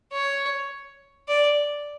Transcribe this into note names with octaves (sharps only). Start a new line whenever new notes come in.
C#5
D5